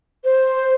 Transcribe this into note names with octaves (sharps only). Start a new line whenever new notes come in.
C5